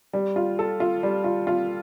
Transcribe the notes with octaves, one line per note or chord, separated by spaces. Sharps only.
G3
F4
A4
F4
G3
F4
F4